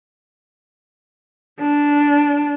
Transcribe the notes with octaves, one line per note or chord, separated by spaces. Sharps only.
D4